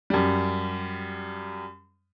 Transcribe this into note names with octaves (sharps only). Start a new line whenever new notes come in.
F#2 G3